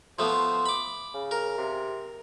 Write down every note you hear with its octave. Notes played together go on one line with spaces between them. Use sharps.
F3 A3 B3 C5
B5 D6
C#3
A#4
C3